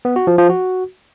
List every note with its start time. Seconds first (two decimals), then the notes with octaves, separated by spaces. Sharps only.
0.05 B3
0.16 F#4
0.27 F3
0.38 F3
0.49 F#4